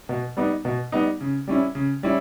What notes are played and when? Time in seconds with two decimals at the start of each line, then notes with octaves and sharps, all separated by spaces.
0.09 B2
0.37 G3 B3 D#4
0.65 B2
0.92 G3 B3 D#4
1.21 C#3
1.48 G3 C#4 E4
1.75 C#3
2.03 G3 C#4 E4